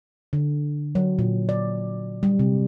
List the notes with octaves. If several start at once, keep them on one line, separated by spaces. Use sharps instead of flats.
D3
F#3
A#2
D5
G3
C3